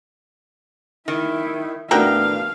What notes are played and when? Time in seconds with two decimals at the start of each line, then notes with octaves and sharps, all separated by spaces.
1.08 D#3 E4
1.91 A2 A3 B3 D4 F#4 A#4 F5 G5